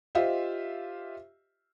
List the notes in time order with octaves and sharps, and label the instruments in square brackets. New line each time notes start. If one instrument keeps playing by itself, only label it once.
[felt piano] F4 G4 C5 D#5 E5